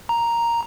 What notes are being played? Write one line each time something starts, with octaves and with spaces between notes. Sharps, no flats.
A#5